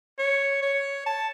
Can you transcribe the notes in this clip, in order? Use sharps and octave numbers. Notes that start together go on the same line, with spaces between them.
C#5
C#5
A5